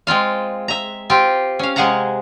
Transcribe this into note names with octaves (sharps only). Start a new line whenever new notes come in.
G#3 C4 F4 F5
E5 A#5
C4 F4 G4
C#4 F5
C3 G#3 G#4 F5 F#5 A#5